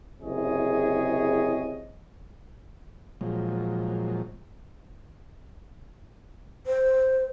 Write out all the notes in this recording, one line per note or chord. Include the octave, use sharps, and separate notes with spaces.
F#1 C3 E4 G#4 C#5 D#5
A#2 F3 F#3 G#3
C5